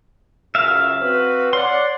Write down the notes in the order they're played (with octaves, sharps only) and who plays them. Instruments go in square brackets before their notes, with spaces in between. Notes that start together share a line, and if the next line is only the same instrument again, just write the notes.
[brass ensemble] C#2 F#2 C#3 [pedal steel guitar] E5 F5
[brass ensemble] C4 F#4 B4
[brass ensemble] C#5 D5 F#5 [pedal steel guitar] C6